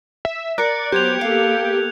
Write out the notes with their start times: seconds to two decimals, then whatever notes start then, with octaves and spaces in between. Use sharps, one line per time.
0.25 E5
0.58 A#4 D5 F#6 C#7
0.92 F#3 B3 G4 C5 G6 G#6 F7
1.21 A#3 B3 A4 F5